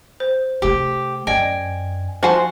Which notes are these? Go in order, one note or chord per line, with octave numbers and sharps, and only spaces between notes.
C5
C3 A3 G4
F#2 D5 D#5 G5 G#5
F3 F#4 C5 G#5 A5